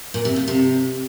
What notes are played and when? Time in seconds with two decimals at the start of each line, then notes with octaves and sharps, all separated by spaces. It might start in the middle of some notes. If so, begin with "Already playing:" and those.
0.14 A#2
0.25 C3
0.36 A#2
0.48 C3